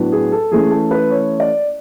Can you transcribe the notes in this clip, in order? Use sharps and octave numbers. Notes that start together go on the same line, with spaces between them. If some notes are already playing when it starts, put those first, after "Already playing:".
Already playing: A2 F#3 B3 D4
G#4
A4
E3 A3 C#4 G#4
A4
B4
C#5
D5